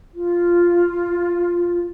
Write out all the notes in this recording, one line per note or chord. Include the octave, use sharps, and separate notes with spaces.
F4